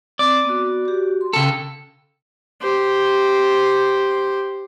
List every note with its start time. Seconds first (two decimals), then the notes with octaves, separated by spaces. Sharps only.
0.19 C4 D5
0.45 B3 F#4
0.85 F#4 G4
1.21 C6
1.33 C#3 A4 G5
2.62 G4 C5